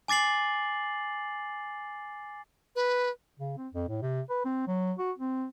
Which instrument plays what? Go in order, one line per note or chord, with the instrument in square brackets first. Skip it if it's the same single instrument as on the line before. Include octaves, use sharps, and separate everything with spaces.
[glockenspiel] G#5 D6 A6 C7 F#7
[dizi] B4
[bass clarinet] C#3
C4
F2
A2
C3
B4
C4
F#3
F#4
C4